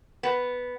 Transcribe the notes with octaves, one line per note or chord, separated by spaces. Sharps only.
B3